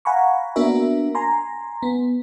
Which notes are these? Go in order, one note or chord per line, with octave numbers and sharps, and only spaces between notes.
F5 F#5 G#5 A#5 B5 C#6
A#3 B3 D4 F#4 A#4 E5
G#5 A#5 C6
B3